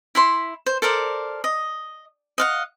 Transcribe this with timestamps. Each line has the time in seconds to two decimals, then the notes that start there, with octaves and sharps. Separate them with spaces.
0.15 E4 B5 C6
0.66 C5
0.82 A4 A#4 C5 D5
1.44 D#5
2.38 D#5 F5 F#5